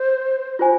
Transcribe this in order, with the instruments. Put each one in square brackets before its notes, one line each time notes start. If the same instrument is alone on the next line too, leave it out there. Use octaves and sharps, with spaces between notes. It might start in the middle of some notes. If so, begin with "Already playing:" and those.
Already playing: [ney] C5
[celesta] F4 C5 G#5